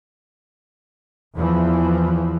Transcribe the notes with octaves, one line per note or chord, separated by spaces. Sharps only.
E2 E3 F3